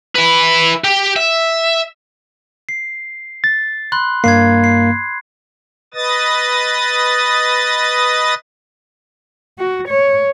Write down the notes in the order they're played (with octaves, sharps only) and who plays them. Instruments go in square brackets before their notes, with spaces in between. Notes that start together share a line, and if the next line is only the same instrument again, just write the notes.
[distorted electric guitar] E4 B4
G4
E5
[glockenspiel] C7
[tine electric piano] A6
[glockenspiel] B5 C6 F#6
[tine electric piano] G2 A#3 [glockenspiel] G#6 C7
[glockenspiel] C7
[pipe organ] B4 D#5 D#6 A6
[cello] F#4
C#5